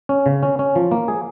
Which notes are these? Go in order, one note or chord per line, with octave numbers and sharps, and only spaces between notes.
C#4
C#3
C#4
C#4
F3
A#3
G#4